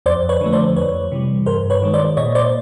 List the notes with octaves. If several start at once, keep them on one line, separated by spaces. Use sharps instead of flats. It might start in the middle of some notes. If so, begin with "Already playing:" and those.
F2 C5 D5
B4 C#5
D3 F3 A3
C5 D5
F2 B4 C#5
C3 E3 G3
G2 A#4 C5
B4 C#5
D#3 G#3
C5 D5
A#2 C#5 D#5
C5 D5